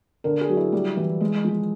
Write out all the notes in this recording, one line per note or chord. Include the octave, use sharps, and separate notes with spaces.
D3 A#4
G#4
F#3
E4
G3
E3
G#3
F3